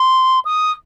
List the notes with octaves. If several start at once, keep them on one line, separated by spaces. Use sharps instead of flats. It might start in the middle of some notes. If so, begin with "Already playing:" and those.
Already playing: C6
D#6